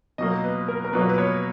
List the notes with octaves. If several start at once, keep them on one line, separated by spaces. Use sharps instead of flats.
B2 F#3 A#3 D#5
B4
A#4
A#4
B2 F#3 A#3 B4
B4
C#5